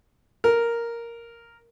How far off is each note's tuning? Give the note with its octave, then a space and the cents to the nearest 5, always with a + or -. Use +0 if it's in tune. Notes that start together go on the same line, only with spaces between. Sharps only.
A#4 +0